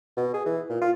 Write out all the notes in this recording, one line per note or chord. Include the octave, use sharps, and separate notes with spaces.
B2
G#4
E3
A#2
F4